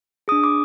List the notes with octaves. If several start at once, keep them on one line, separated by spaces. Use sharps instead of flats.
D4 G#4 D#6
D6